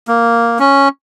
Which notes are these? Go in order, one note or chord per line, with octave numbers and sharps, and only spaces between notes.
A#3
C#4